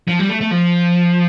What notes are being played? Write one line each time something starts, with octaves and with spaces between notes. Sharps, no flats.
F3
G3
A3
A3
F3